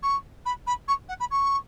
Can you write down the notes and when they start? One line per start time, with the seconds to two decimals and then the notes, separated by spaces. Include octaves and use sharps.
0.03 C#6
0.45 B5
0.67 B5
0.88 C#6
1.09 F#5
1.20 B5
1.31 C#6